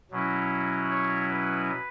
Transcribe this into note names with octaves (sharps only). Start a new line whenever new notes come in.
B2 F#3 C#4 E4
C#5
B4